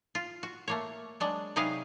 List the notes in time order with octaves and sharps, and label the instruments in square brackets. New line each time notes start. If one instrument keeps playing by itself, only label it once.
[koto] F4
F#4
A3 A#3 C#5
F#3 G#3 D4
C3 F#3 D#4 G#4 B4 F5